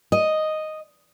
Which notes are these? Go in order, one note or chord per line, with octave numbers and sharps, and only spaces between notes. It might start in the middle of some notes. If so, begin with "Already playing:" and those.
D#5